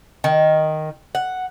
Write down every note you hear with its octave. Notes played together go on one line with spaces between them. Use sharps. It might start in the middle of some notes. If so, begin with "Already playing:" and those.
D#3
F#5